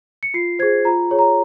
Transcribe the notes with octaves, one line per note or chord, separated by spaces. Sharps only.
C#7
F4 C7
G#4 C5 G#6
F4 A#5
G#4 C#5
A#5